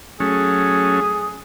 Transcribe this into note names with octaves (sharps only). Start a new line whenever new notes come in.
F#3 A3 C#4 G#4